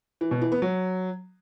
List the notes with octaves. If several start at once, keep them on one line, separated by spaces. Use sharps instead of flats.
E3
B2
E3
B3
F#3